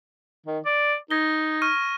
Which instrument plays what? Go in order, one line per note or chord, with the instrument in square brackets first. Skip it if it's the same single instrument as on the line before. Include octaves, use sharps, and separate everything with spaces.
[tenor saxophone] D#3
D5
[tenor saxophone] D#4 [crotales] G#6 A#6 G7
[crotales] C#6 F6 D#7